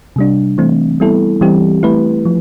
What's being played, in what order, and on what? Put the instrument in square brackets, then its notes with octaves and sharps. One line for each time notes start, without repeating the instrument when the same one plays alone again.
[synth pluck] C3 G3 D4
E3 A3 C4
G3 B3 E4 A4
E3 G3 C4 G4
A3 E4 B4
F3